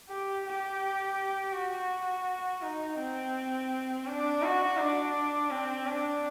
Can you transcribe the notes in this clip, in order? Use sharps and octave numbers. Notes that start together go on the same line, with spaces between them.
G4
G4
F#4
D#4
C4
D4
F#4
D4
C4
D4